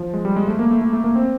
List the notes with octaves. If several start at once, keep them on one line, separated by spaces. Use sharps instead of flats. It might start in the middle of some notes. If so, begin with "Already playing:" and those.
Already playing: F3
G#3
G3
G#3
A3
A#3
A3
A3
A3
A#3
C4